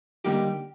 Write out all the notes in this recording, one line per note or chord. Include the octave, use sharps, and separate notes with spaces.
D3 G3 A#3 D#4 G4